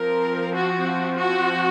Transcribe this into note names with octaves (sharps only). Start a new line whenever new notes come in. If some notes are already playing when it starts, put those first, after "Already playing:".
Already playing: F3 C4 A#4
F#4
F#4